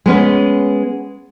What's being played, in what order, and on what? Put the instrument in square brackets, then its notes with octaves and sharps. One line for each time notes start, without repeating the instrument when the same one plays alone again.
[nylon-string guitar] G#3 B3 C#4